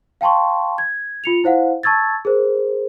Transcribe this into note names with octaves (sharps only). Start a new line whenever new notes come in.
F5 G5 A5 C6 C#6
G#6
F4 C#7 F7
E4 C5 F5 F#5
A5 C#6 E6 G#6 A6
G#4 A#4 C5